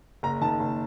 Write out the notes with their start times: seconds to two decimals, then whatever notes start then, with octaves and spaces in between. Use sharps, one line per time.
0.23 F#1 A#5
0.41 D#3 A5
0.60 F#1